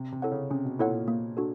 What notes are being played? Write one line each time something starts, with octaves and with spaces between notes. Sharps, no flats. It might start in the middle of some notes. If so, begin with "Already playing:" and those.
Already playing: C3
C3
E4 A4 C#5 F#5
C#3
C3 C#4
B2
A#2 E4 A4 C#5 F#5
A#2
A#3
D4 F#4 A4